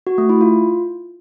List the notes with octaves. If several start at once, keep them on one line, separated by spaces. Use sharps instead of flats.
F#4
A3
E4
F4